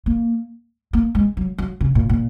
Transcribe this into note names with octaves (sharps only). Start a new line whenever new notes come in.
A#3
A#3
G#3
F#3
F#3
C#3
A#2
A#2